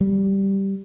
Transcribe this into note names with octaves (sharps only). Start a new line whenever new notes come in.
G3